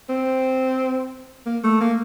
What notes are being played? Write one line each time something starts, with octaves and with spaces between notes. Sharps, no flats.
C4
A#3
A3
A#3